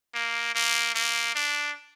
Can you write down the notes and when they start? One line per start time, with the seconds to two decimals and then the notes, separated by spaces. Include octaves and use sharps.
0.15 A#3
0.55 A#3
0.95 A#3
1.35 D4